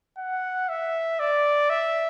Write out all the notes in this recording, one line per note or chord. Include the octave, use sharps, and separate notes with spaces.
F#5
E5
D5
E5